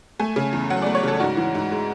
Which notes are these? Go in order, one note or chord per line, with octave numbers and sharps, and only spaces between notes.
A3 G#5
C#3
E2
F#3 F#5
D5
A3
C#5
C#3 A4
G#2 F#4
E3
G#2
G#3